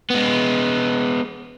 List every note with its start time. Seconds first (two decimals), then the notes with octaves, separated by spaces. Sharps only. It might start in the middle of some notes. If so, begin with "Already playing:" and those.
0.10 G#3 B3